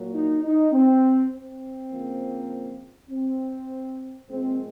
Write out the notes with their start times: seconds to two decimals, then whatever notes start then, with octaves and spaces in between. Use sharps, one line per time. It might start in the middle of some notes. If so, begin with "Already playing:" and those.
Already playing: A#2 F#3 A#3
0.12 D#4
0.43 D#4
0.72 C4
1.32 C4
1.92 C#3 F3 A#3
3.10 C4
4.30 A#2 F3 G#3 C4